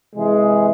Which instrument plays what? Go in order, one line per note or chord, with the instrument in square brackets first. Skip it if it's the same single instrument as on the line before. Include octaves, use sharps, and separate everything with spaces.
[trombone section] C3 E3 G#3